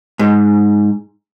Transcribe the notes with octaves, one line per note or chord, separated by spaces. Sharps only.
G#2